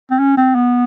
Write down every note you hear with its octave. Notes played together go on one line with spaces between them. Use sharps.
C4
C#4
C4
B3